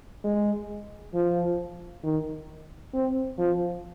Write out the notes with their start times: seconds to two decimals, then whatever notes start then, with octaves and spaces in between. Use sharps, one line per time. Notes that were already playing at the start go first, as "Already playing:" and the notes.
0.24 G#3
1.14 F3
2.03 D#3
2.93 C4
3.38 F3